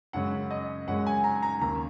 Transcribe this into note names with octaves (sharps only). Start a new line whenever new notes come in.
F#2 C#3 G#3 C#4 F#5
D#5
F#2 C#3 G#3 C#4 F#5
G#5
A#5
A#5
D#2 C#3 A#3 A#5